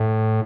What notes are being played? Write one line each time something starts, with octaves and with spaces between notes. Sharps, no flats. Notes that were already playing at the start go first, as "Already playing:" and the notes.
Already playing: A2